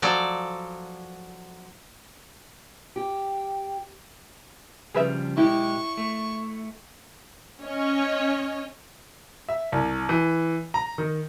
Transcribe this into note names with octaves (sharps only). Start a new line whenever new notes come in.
F3 F#3 A4 D5
G4
C#3 F3 G3 G#4 B4 E5
B1 G#3 E4 G4 C#6
A3
C#4 C#5 D#5
E5
C2
E3
A#5
D#3